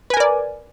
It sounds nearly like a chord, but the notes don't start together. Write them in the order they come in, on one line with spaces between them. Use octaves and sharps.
B4 G#5 A#4 D5